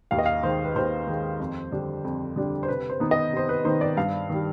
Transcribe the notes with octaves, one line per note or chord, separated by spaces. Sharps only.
D#2 F5
D#5
F5
D#3 G#3 C5
B4
D#2 C5
D#3 G#3
F2
D3 G3 D4
F2
D3 G3 D4
C5
C3 B4
C5
D#3 B3 D#4
D#5
C3 C5
B4
D#3 B3 D#4 C5
D5
G2 F5
D#3 G3